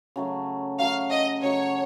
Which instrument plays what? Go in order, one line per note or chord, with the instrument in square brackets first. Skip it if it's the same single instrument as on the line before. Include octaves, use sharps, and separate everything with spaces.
[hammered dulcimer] C#3 F#3 A3
[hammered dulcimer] C#3 F#3 A3 [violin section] F5
[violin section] D#5
[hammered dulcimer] C#3 F#3 A3 [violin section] C#5